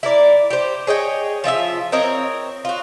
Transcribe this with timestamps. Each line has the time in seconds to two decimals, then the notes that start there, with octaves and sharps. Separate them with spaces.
0.03 E4 A#4 D5
0.50 G4 C5
0.87 G#4 C#5 D#5 G5
1.44 F3 F4 D#5 E5
1.92 C4 A#4 C#5 D#5
2.65 F4 F#4